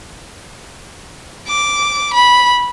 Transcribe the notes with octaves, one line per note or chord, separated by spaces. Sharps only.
D6
B5